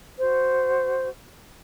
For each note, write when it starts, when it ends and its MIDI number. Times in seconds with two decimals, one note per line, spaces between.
0.20 1.09 66
0.20 1.09 72